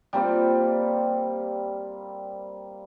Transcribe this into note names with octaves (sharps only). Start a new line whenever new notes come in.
G3 A#3 C4 F4